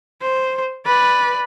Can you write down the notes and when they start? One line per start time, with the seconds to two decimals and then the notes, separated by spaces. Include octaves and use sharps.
0.22 C5
0.86 B4 D5